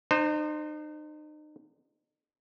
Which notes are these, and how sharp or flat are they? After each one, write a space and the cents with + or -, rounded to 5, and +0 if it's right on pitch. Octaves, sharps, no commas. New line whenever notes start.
D#4 -40 C5 +0